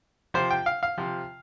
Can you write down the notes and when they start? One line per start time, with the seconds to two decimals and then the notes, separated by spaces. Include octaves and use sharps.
0.34 C3 F3 C5
0.51 G5
0.66 F5
0.83 F5
0.98 C3 F3